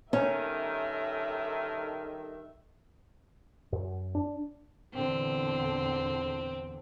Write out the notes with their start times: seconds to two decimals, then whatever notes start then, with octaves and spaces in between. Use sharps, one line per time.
0.13 G2 D#3 C#4 A4 E5
3.72 F#2
4.15 D4
4.94 E2 A#2 D3 C4